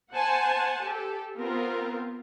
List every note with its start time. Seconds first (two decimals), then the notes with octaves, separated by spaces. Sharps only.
0.13 C5 F#5 G#5 A5
0.85 G4 A4
1.37 B3 C4 F4 A#4